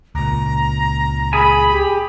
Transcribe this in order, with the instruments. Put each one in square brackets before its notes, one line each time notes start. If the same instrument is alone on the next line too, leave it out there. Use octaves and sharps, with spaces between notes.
[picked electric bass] C#2 A#2 [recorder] A#5
[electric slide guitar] G#4 G#5 [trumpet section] B5
[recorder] G4